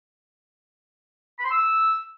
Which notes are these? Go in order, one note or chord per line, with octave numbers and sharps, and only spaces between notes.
B5
C6
E6